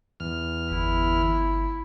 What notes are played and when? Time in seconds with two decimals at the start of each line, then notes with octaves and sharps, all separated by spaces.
0.20 E2 F6
0.71 G1 E4